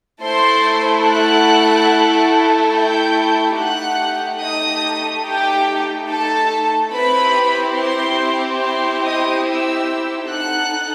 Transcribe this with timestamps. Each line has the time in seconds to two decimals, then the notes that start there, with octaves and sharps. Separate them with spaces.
0.23 A3 E4 A4 C5 C6
1.06 F#5 F#6
2.74 G5 G6
3.58 A3 D#4 G4 F#5 F#6
4.42 D#5 D#6
5.26 G4 G5
6.10 A4 A5
6.93 C4 E4 G4 B4 B5
7.77 C5 C6
8.62 C5 C6
9.04 D#5 D#6
9.45 E5 E6
10.28 D#4 A4 F#5 F#6